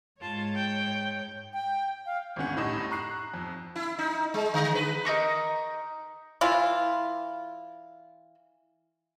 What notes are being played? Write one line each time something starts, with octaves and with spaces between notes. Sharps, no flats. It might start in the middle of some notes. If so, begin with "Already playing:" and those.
G#2 F4 C#5 A5
G5
G5
F5
G#1 D2 C#4 F#5
C2 A2 D#4 E7
A#5 C#6 F#6 C7
F2
E4
D#4
G#3
D3
B4
D#4 G#4 A#4 C#6
E3 E4 F4